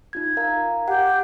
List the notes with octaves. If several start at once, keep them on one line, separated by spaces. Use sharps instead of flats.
D#4 F4 G#6
A#4 F5 A#5
G4 F#5